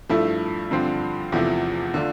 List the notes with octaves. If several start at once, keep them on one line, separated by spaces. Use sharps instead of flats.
G2 F3 A3 E4
G2 D3 F3 C4
E2 C3 F3 A3 E4
D3 A3 D4 F4